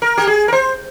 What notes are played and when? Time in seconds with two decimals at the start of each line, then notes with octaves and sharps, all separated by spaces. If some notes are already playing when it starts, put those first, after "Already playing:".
0.02 A#4
0.17 G4
0.27 G#4
0.48 A#4
0.53 C5